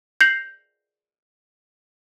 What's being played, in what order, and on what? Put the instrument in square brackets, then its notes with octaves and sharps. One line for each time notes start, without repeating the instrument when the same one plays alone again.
[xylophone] G6 A#6 C7 F7 F#7